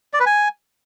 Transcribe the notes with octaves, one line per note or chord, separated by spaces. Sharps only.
D5
B4
G#5